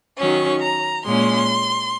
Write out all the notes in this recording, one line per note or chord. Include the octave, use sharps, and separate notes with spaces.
D#3 F#3 C#4 C#6
A#5
A#2 G#3 C#4 C6